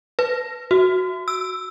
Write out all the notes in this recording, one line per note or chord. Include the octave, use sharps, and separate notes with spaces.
B4
F#4
E6